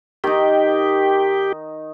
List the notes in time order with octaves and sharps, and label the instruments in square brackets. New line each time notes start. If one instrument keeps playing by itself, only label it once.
[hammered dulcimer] D#3 D#4 [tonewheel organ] G4